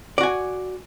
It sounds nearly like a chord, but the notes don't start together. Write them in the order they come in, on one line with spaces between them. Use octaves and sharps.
D5 F#4 G#5